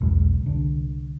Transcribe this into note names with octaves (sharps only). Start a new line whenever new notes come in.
B1 E2 G#3
C2 D3